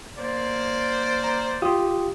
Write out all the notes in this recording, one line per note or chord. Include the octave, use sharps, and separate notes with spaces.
A#3 C5 D5
A#5
F4 G4 D#6